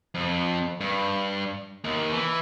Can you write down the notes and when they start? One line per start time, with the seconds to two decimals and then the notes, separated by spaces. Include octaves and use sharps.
0.15 F2
0.81 G2
1.84 D#2
2.12 E3